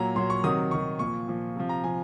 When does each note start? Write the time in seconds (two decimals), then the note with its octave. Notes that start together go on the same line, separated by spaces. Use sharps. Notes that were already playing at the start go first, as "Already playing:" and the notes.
Already playing: A#2 F#3 A#5
0.16 A#2 F#3 C6
0.30 C#6
0.44 C3 D#3 F#3 D#6
0.71 C3 D#3 F#3 C#6
0.99 A#2 F3 C#6
1.28 A#2 F3
1.56 C3 F3
1.69 A#5
1.84 C3 F3 G#5